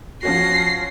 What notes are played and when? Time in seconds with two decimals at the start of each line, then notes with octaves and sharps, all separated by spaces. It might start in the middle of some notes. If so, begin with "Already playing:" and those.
0.23 F3 C#4 F#4 A#6 C7